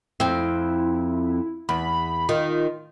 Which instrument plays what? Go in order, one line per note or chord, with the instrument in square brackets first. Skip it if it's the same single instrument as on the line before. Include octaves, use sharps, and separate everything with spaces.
[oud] F2 C4 [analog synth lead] E4
[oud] E2 [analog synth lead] B5
[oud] D#3 [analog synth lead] F4